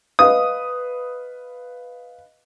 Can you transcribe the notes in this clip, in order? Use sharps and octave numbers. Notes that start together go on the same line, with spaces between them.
B4 D#5 F5 D#6